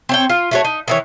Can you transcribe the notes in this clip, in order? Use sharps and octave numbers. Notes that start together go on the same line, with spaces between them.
C4 C#5 G5
F4
A3 F#4 C#5
D#4
D#3 E3 C#5